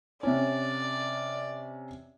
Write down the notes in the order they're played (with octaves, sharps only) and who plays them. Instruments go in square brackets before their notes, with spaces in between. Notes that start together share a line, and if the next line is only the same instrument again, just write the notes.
[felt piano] C3 C#4 [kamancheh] D5